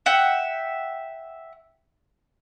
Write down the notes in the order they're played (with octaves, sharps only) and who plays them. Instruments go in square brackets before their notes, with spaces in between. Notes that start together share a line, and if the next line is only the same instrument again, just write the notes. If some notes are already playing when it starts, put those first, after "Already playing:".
[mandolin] E5 F#5 G5